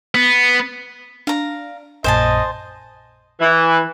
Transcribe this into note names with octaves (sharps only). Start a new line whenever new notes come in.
B3
D4 F5 A#5
A#1 F#2 A#2 C5 D#5 G#5 A5
E3